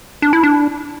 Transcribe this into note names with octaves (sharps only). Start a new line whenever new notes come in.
D4
E4
D4